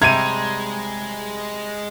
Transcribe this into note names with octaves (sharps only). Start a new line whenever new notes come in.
C3 G3 G#3 G#6 D#7